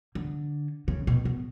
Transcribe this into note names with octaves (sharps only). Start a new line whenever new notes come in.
D3
C#3
B2
B2